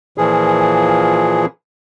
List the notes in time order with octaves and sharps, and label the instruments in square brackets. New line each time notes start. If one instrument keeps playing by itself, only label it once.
[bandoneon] A#2 E3 F3 G#4